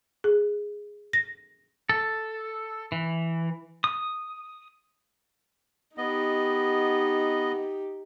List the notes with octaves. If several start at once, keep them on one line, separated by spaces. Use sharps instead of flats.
G#4
A#6
A4
E3
D#6
B3 D#4 G4 D#5